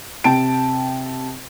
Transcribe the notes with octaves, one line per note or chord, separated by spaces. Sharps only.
C3 G5 A5 D7